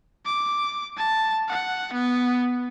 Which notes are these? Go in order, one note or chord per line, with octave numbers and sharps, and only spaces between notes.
D6
A5
F#5
B3